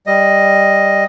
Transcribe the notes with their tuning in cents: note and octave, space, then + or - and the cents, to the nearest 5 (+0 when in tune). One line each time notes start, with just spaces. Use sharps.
G3 +5 D#5 +0